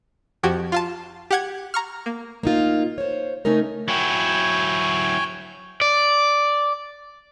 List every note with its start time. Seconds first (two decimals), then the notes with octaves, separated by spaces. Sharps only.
0.43 F2 F3 F#4 G4 G#6
0.72 F4 F5 A5
1.31 G4 F#5 G#6
1.74 A#5 C#6 F6
2.06 A#3
2.43 A#3 D#4 F4
2.98 C5 C#5
3.45 C#3 A3 C#4 D#4 A#4
3.88 F#3 E4 C#5 G5 G#5
5.81 D5